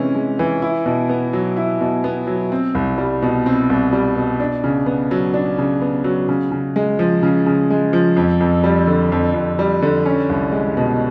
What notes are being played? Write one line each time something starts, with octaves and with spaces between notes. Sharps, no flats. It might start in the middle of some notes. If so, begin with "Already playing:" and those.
Already playing: C3 E3 G#3 C#4
G#3
E3
E4
B2
B3
F#3
E4
B2
B3
F#3
C4
C2
G3
B2
C4
C2
G3
B2
D4
C#3
B3
F#3
D4
C#3
B3
F#3
C#3
C#3
G#3
F3
C#3
C#3
G#3
F3
F2
F2
G3
D3
F2
F2
G3
D3
C#4
C2
G#3
B2